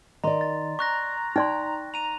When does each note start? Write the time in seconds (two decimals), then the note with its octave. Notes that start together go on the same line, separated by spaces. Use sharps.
0.24 D#3 D5 D#5 A#5 C6
0.41 A6
0.79 A#5 C#6 F#6 A#6
1.36 D#4 D5 G5 C6
1.94 A#5 D#7 F7